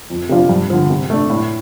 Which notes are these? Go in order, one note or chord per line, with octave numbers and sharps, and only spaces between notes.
F2
C3 F3 D4 F4
G2
D3 F3
C3
A3 D4
A2